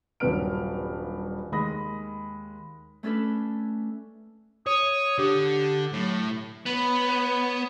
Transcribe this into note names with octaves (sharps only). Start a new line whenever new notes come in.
D#1 G2 F#3 B4 F6 D7
D#2 G#3 B5 D#6 A#6
A3 C#4 D4 A4 B4
C#5 D#6
D3 G4
A2 F#3
B3 B4 C#5